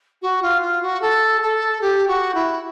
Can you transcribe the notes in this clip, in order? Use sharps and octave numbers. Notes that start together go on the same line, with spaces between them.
F#4
F4
F4
F#4
A4
A4
G4
F#4
E4